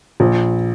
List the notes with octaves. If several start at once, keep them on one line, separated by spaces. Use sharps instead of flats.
A#1